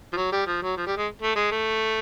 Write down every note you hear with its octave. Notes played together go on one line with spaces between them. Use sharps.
F3
F#3
G3
F3
F#3
F3
G3
G#3
A3
G#3
A3